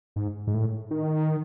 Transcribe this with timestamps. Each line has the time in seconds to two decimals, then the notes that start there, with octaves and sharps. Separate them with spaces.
0.16 G#2
0.47 G#2
0.54 A2
0.91 D#3